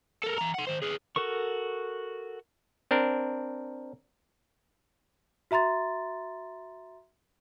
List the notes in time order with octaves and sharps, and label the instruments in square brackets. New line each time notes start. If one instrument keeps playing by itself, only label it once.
[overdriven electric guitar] A4 A#4
E3 A#5
F#5 C6
D#3 C5
G#4 B4
[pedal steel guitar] F#4 A4 A#4 C#6
[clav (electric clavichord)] C4 D4 A#4
[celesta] F#4 E5 A#5 C6 A6